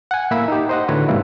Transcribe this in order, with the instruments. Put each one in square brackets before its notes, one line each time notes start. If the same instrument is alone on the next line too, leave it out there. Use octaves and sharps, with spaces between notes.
[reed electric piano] F#5 G#5
A2 A#3 E5 B5
D#4 G4
C5 D#5 F#5
A2 D3 F#4 B4 C#5
G#2 C3 E3 G3 A#3 E4